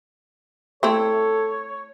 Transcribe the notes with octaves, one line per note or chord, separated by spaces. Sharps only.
A3 C4 E4 A4 C#5